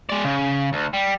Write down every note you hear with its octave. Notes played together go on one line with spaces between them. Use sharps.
G#3 D5
C#3
D2
G3